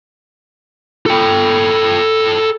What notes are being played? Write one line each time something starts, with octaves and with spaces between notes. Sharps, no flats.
A4 G5